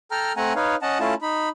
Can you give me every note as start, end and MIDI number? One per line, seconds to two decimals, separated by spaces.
0.11 0.33 69
0.11 0.33 79
0.11 0.33 82
0.11 0.33 89
0.37 0.53 57
0.37 0.53 60
0.37 0.53 78
0.37 0.53 80
0.37 0.53 82
0.56 0.76 63
0.56 0.76 71
0.56 0.76 73
0.56 0.76 77
0.82 0.99 61
0.82 0.99 75
0.82 0.99 78
0.82 0.99 81
1.00 1.14 57
1.00 1.14 61
1.00 1.14 64
1.00 1.14 65
1.00 1.14 81
1.22 1.49 63
1.22 1.49 83